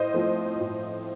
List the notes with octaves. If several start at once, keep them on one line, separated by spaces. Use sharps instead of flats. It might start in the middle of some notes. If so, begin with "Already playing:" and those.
Already playing: A2 C5 D#5
F3 A3 C4
A2